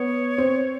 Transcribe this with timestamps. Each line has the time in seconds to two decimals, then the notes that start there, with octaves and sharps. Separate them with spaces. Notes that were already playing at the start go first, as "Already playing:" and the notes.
Already playing: B3 C#5
0.38 C4